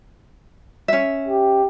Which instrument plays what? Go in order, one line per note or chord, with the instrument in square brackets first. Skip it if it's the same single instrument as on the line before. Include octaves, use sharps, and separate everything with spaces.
[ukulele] C#4 E5
[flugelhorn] G4